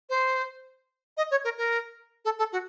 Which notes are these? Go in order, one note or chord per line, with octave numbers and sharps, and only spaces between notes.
C5
D#5
C#5
A#4
A#4
A4
A4
F#4